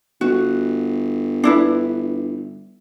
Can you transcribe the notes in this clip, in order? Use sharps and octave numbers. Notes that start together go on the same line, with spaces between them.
G1 F#4
D4 E4 B4